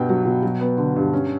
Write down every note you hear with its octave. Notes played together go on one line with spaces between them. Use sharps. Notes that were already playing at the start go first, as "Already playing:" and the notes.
Already playing: G2 B2 B3 G5
F#3
B2
F#3
B3
D3
G2
C#4